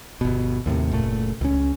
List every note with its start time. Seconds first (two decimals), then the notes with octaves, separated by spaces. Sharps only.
0.21 G1 B2
0.66 D#2 A2 C3
0.91 F#1 A#2 A3
1.41 C#2 C#4